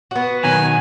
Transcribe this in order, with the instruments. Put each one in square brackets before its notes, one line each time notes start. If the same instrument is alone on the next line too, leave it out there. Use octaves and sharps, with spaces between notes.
[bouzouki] B3 F#4
[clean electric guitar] B2 D#3 F#3 [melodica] G#5